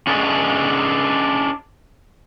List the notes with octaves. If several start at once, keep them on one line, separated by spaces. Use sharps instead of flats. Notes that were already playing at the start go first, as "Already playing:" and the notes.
C#4 D4 G#4 A4 D5 D#5